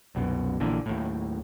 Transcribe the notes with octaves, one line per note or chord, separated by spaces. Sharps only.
C2 F#2 B2
A#1 A#2 D3 E3
D#2 A2